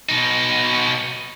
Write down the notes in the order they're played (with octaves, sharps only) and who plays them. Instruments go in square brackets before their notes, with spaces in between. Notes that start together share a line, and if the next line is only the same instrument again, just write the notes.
[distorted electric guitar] B2 D#4